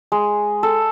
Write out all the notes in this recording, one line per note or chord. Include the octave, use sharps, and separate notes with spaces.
G#3
A4